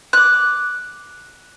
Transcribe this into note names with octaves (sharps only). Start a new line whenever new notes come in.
D6 F#6